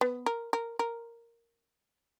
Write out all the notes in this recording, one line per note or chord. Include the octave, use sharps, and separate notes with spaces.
B3
A#4
A#4
A#4